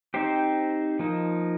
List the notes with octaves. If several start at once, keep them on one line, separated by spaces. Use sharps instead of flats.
C4 D#4 G4 C5
F3 A#3 D#4